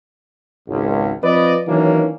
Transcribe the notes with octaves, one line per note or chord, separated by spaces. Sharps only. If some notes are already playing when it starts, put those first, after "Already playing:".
G#1 C#2
F3 C4 B4 D5 D#5
D#3 E3 F#3 A#3 C#4 D4